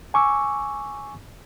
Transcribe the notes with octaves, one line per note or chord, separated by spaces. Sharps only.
G#5 C#6 D6 E6